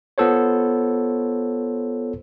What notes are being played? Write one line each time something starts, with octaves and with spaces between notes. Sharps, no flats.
B3 F4 A4 C5 C#5